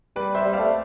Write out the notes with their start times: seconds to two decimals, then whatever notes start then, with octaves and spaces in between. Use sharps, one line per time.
0.16 G3 B4 D5
0.35 C5 E5
0.45 G3
0.53 D5 F5
0.59 A3